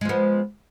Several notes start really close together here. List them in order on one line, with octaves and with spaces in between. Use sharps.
G#3 F3 B3